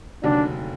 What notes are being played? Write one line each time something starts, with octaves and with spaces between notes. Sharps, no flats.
F1 D#2 D3 F#3 D4